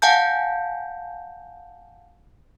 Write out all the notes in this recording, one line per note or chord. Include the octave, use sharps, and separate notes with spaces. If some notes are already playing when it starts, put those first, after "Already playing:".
F5 F#5 G#5 A5 G6